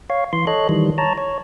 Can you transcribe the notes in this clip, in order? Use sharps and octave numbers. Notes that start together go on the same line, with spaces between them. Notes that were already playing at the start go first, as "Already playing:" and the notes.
C#5 F5
E3 C6
A4 C#5 D#5 F#6
D#3 E3 G3
C#5 A5 A#5
C#5